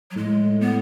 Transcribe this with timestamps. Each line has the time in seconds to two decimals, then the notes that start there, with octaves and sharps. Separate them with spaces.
0.11 F#3
0.16 A2 G#3
0.61 B3